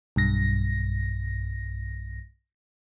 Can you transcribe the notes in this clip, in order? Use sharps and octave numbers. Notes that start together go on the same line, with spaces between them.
B1 G2 A#6